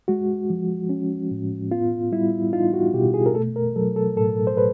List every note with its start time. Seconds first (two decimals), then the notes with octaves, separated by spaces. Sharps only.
0.08 G#3 F#4
0.50 F3
0.89 C#4
1.31 A2
1.71 B3 F4
2.12 G3 E4
2.53 D#4 F4
2.74 F#4
2.94 B2 G4
3.14 G#4
3.26 A#4
3.35 A3 A4
3.56 A#4
3.76 F#3 A4
3.96 A4
4.16 A2 A4
4.47 C5
4.57 A2 B4